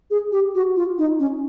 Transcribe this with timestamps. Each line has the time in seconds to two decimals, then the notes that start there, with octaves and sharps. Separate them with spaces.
0.11 G#4
0.32 G4
0.55 F#4
0.76 F4
0.98 D#4
1.19 C#4